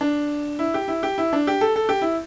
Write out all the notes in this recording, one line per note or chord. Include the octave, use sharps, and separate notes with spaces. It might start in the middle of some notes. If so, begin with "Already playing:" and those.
D4
E4
G4
E4
G4
E4
D4
G4
A4
A4
G4
E4